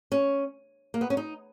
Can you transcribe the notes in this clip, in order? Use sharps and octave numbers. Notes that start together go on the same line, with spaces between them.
C#4
A#3
B3
C#4
D#4